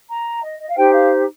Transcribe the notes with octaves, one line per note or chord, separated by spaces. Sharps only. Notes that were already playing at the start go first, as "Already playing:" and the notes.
A#5
D#5
D#5
F5
D#4 G4 C5 G5
F5